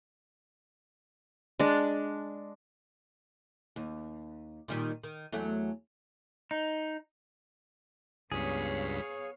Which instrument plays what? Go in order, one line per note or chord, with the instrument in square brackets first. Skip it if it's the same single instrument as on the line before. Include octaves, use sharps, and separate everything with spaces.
[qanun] G#3 D4
[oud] D#2
A#2 D#3 G3
D#3
E2 F#3 A3
[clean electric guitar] D#4
[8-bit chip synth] C#2 G2 B6 [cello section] B3 C#5 F5 [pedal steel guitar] G#4